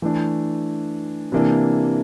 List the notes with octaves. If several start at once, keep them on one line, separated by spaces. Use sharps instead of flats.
E3 A3 D4
C3 E3 A#3 D4